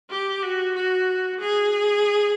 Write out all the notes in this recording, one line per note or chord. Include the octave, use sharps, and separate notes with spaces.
G4
F#4
F#4
G#4